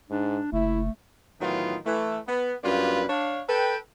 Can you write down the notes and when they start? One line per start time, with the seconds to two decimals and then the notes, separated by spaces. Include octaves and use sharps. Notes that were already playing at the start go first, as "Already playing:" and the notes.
0.10 G#2 D4
0.53 F#1 A3 E4
1.41 A2 D#3 E3 F#3 B3 F4
1.86 E3 A3
2.28 B3
2.64 F#2 G3 A#3 D4 F4 B4
3.09 D4 C#5 F5
3.49 A4 B4 G5